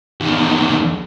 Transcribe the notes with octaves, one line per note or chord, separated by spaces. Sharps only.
E2 D#3